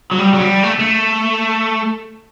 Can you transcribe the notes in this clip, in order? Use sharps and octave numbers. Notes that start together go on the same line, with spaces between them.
F#3
G3
F#3
G3
A3
A3